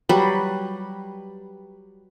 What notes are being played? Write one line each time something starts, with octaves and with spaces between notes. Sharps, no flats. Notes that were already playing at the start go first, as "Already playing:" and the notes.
F#3 G3 B4